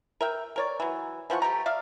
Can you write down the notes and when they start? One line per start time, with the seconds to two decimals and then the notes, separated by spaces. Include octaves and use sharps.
0.21 A#4 E5 G5
0.56 A#4 C#5 D5
0.80 E3 F#3
1.30 E3 F3 F#5 C#6
1.42 G3 A3 G4 A#5
1.66 D5 E5 F5